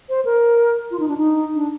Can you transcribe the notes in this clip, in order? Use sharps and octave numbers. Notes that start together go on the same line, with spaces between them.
C5
A#4
F4
D#4
D4
D#4
D4